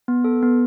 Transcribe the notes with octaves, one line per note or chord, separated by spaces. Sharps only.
B3
A4
B3